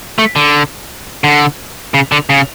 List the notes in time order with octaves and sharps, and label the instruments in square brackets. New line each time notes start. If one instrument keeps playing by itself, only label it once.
[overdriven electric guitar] A3
D3
D3
C#3
D3
C#3